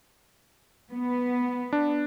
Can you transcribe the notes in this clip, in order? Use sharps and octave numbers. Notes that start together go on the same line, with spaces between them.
B3
D4